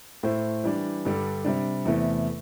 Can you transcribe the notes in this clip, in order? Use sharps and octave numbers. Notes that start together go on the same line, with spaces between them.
A2 A3 E4 C5
E3 G3 D4
G2 D3 G3 D4 A4
C3 G3 D4
E2 C3 A3 E4